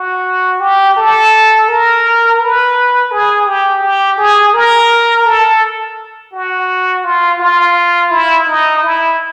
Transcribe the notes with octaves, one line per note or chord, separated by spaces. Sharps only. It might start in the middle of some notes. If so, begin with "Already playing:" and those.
Already playing: F#4
G4
A4
A#4
B4
G#4
G4
G4
G#4
A#4
A4
F#4
F4
F4
E4
D#4
E4